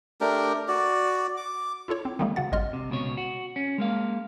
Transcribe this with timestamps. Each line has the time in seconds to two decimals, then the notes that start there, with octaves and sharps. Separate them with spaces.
0.21 A3 D4 G4 A#4
0.68 F#4 D5
1.37 D6
1.88 E4 F4 A4 C#5
2.05 C4
2.19 D#3 F3 G3 G#3 A#3 G#4
2.36 C#3 F#4 F#5 A6
2.52 G#1 G2 D#5 C6 F6
2.73 C3
2.90 C#2 B2 C#5
3.17 F#4
3.56 C#4
3.78 G#3 A#3 F5